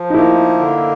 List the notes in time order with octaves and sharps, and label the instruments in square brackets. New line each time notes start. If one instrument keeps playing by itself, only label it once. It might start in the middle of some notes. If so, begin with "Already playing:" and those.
Already playing: [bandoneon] F3
[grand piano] D#4
[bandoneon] A#3 [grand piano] E4
[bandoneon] D3